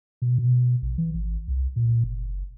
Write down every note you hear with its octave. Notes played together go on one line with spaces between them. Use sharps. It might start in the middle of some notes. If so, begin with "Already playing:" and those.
B2
B2
A#1
E3
G#1
C2
A#2
F#1